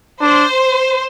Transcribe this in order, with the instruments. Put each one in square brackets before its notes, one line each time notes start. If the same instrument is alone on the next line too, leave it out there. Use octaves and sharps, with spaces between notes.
[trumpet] D4 [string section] C5